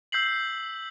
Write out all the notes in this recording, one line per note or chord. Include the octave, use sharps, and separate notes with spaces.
E6 G6 B6 C7 F#7